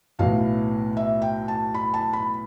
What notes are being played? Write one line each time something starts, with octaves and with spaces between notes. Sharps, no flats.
B1 A2 E3 F5
E5
G5
A5
B5
A5
B5